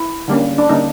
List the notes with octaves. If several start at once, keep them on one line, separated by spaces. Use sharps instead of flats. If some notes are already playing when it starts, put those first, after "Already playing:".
Already playing: E4
D3 G3 A#3 C#4
D4
D3 G3 A#3 C#4 D#4